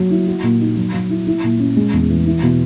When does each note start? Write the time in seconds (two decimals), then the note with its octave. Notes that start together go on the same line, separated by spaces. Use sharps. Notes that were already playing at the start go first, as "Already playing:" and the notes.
Already playing: F#3
0.11 E4
0.27 F#4
0.43 A#2
0.61 D#4
0.77 F#3
0.94 F#3
1.10 E4
1.27 E4
1.44 A#2
1.60 C#4
1.77 G#3
1.93 E2
2.10 E3
2.26 E4
2.43 B2